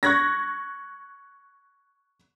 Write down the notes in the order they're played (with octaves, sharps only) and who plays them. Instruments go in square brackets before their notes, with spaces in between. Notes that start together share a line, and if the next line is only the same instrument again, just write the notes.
[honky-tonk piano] C#6 F#6 G#6 A#6